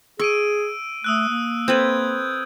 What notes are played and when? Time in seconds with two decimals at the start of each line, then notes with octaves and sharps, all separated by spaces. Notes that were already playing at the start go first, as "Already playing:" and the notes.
0.19 G#4 C#6 E6 D7 D#7
1.04 A3 D#6 E6 F#6
1.29 A#3
1.68 C4 A4 B4 G6 G#6